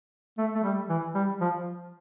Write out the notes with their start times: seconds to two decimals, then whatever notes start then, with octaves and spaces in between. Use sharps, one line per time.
0.38 A3
0.55 A3
0.63 G3
0.89 E3
1.15 G3
1.41 F3